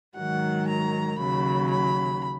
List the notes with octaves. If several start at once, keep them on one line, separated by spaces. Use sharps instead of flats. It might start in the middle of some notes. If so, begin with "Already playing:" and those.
G#2 D#3 F#3 F#5
A#5
D#2 C#3 F#3 B5
B5